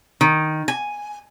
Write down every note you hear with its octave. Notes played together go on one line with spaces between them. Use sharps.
D#3
G#5